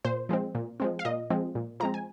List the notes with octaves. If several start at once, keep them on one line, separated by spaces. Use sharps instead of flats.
A#2 C5
F3 G#3 C4
A#2
F3 G#3 C4
F5
A#2 D#5
F3 G#3 C4
A#2
F3 G#3 C4 A#5
G#5